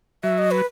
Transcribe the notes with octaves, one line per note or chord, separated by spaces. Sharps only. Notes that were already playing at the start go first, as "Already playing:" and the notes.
F#3 E5
D#5
B4